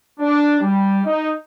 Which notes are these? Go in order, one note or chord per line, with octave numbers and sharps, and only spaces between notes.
D4
G3
D#4